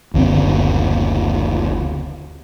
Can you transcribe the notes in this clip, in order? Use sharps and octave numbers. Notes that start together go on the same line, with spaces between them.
F#1 D2 C#3 C4